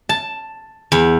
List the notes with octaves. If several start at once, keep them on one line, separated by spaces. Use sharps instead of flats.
A5
E2